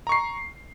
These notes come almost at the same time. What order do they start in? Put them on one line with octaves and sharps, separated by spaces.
A#5 C#6 C7